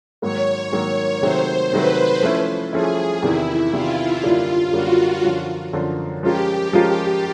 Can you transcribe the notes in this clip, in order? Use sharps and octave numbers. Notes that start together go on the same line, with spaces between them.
G#2 D#3 F#3 A#3 C#5
G#2 D#3 F#3 A#3 C#5
C3 D#3 F#3 A3 C5
C3 D#3 F#3 A3 B4
F3 A3 C#4 E4
F3 A3 C#4 E4 G#4
E2 C3 D#3 E4
E2 C3 D#3 F4
F#2 D3 G3 A#3 D4 F4
F#2 D3 G3 A#3 D4 F#4
F#2 D3 F3
F#2 D3 F3
F3 G#3 C#4 F4 G4 A#4
F3 G#3 C#4 F4 A#4